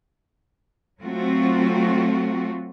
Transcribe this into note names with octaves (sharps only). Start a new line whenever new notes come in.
F#3 A3 C4 F4 F#4